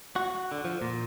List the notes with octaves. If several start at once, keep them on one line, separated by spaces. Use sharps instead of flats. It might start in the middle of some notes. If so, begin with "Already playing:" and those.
F#4
D3
F3
A#2